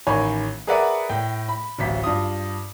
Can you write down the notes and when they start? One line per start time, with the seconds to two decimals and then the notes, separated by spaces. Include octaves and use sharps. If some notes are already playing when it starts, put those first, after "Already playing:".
0.07 A1 D#3 C#5 G#5 B5
0.67 G#4 A#4 B4 D5 E5 F#5
1.09 A2 G5
1.48 B5
1.79 D1 A1 B6
2.04 G2 F4 D#6